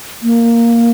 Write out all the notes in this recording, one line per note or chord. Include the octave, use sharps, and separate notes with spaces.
A#3